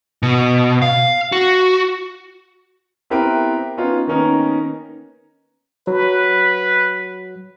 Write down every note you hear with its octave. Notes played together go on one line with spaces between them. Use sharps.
B2
F5
F#4
B3 C4 E4 G4 A#4 B4
B3 C#4 D#4 F4
D#3 A#3 B3 C#4 D#4 A#4
F#3 B4